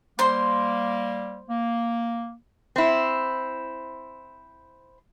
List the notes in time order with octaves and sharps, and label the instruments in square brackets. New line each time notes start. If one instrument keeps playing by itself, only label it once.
[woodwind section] G3 A#3 [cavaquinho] C5 C6
[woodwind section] A#3
[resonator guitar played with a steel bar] C4 E4